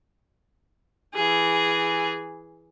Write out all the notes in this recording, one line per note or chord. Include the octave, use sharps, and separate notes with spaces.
E3 G#4